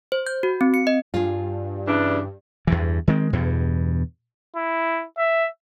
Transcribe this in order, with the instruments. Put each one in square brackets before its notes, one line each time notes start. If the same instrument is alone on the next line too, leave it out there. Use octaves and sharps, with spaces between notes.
[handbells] C5
G6
F#4
C4
C#7
D#5
[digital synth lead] G2 [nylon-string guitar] F4 G#4
[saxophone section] C#3 E3 D4
[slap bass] E2 G2 E3
D#3 G#3 C4
E2 G2 B2
[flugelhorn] E4
E5